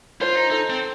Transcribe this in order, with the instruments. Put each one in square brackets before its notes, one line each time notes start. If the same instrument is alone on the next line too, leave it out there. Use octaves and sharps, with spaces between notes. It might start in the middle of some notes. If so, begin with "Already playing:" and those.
[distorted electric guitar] F4 [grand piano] C5
[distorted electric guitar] D#4
[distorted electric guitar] D#4 [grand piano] A4
[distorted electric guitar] C4